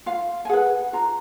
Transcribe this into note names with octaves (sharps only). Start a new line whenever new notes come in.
F4 F5
G#5
G#4 B4 F#5
F4 A#5